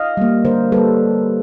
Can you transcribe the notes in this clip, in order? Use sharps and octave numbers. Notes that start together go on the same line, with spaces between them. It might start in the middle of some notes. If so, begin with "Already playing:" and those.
Already playing: D#5 F5
G3 A#3
D3 A#4 C5
G3 A#3 A4 B4